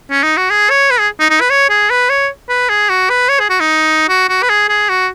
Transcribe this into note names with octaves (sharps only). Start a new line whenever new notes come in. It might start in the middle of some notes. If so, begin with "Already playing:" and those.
C#4
D#4
F#4
G#4
C#5
B4
G#4
D#4
D#4
B4
C#5
G#4
B4
C#5
B4
G#4
F#4
B4
C#5
G#4
F#4
D#4
F#4
F#4
B4
G#4
G#4
F#4